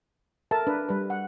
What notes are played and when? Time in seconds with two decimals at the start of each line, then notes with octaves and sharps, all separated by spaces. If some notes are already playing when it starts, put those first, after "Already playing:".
0.51 A4 A#4 E5 A5
0.67 D4 B4
0.89 G3 B4
1.10 F#5